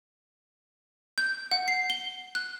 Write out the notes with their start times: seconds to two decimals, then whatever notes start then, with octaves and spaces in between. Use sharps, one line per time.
1.18 G6
1.51 F#5
1.68 C7
1.90 G7
2.35 F#6